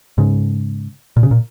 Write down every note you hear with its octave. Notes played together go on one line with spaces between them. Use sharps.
G#2 C#3
A#2
C#3
A#2